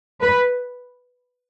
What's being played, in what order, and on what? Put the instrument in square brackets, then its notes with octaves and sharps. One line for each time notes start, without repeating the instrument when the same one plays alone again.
[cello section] B4